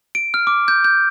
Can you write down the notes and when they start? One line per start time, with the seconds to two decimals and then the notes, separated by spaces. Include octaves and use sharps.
0.15 D7
0.34 F6
0.47 D6
0.68 G6
0.84 G6